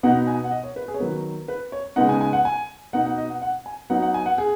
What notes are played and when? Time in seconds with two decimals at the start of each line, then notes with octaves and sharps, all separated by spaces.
0.03 B2 B3 D#4 F#5
0.27 G#5
0.44 F#5
0.51 D#5
0.64 C#5
0.76 B4
0.88 G#4
0.94 C#5
1.00 D#3 F#3 B3 B4
1.48 B4
1.72 C#5
1.96 C#3 G#3 B3 D#4 F#5
2.09 G#5
2.21 G#5
2.33 F#5
2.45 G#5
2.93 B2 B3 D#4 F#5
3.06 F#5
3.18 D#5
3.30 F#5
3.42 F#5
3.66 G#5
3.90 F#3 B3 D#4 F#5
4.02 F#5
4.14 G#5
4.26 F#5
4.38 G#4